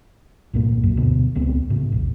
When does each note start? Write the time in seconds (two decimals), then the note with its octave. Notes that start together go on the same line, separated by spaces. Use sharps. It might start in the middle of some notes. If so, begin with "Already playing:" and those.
0.53 C2 G2 A#2 A#3
0.83 F#2
0.97 D2 B2
1.35 D#1 C#2 B3 C4
1.70 A2 C#3
1.92 E1 A#1